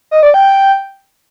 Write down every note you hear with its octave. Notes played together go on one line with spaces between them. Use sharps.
D#5
D5
G5